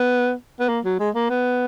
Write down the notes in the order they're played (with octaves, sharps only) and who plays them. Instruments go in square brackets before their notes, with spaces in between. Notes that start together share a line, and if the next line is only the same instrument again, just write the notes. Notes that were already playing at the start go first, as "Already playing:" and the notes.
Already playing: [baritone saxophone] B3
B3
A#3
F#3
G#3
A#3
B3